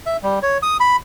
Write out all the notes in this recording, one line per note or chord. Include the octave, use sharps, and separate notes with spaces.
E5
G3
C#5
D#6
B5